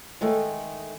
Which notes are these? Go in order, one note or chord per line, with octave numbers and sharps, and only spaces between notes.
D#3 G#3 A3